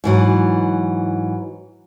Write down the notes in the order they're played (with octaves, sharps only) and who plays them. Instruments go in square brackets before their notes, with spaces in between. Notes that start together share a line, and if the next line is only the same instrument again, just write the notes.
[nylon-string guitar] G#2 E3 F#3